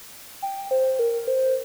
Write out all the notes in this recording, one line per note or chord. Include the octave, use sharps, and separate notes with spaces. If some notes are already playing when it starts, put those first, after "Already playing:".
G5
C5
A#4
C5